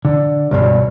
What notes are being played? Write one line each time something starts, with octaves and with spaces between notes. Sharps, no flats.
D3
C#2 G2 B2